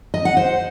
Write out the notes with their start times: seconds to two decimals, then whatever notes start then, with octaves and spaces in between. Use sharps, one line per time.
0.14 D#5
0.25 F#5
0.37 C5